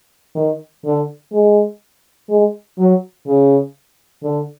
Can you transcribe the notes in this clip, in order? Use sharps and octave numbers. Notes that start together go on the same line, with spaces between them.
D#3
D3
G#3
G#3
F#3
C#3
D3